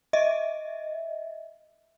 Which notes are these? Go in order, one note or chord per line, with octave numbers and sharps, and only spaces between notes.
D#5 E5